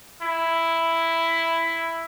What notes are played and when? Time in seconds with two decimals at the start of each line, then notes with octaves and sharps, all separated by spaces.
0.22 E4